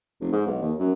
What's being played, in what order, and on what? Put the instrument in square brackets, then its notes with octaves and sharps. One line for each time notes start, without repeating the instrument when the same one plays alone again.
[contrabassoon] F1
G#2
B1
D#2
F#2